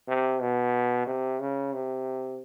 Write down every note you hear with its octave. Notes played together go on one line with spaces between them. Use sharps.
C3
B2
C3
C#3
C3